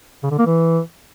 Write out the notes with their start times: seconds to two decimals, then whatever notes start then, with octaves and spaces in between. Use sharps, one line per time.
0.23 C#3
0.31 D3
0.39 A#3
0.46 E3